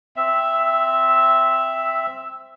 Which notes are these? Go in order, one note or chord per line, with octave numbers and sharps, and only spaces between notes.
C4 E5